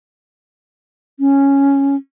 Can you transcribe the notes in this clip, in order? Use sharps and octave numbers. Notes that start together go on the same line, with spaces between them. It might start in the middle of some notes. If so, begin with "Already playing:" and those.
C#4